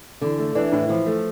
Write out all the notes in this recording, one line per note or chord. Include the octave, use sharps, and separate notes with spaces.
D3 E3
A3
E3 D4
A2
E3 F3
A3